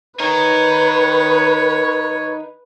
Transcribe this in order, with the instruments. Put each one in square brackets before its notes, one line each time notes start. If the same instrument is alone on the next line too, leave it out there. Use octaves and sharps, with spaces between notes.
[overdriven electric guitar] D#4 A#4 [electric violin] B4 [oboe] C#5